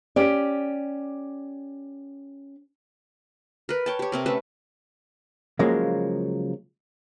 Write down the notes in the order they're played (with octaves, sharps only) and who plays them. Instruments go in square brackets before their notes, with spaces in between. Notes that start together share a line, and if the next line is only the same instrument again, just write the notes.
[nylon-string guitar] C#4 G4 D5
[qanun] A#4 B4
C#5 G5 A5
G4 C#5
C3 C4 A#4
A3 C#4 B4 E5
[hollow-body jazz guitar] C#3 F3 F#3 G#3 A#3